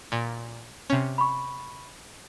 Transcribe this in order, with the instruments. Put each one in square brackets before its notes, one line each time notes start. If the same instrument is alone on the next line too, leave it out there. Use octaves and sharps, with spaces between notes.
[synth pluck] A#2
C3 C#4
[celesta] B5 C#6